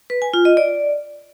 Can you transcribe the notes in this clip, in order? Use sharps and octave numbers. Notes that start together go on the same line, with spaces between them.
B4
G#5
F4
D#5
D5